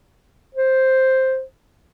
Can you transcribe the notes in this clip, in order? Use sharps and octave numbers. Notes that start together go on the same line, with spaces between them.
C5